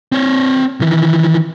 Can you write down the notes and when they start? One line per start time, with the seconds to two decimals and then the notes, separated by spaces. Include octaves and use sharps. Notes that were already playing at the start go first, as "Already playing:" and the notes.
0.12 C4 C#5
0.80 D#3 E3